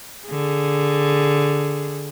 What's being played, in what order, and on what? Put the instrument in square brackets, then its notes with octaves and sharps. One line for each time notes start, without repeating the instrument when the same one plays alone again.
[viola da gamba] D3 G#4